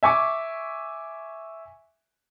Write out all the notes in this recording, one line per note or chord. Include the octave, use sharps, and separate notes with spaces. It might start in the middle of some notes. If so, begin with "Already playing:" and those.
E5 G#5 C#6 D6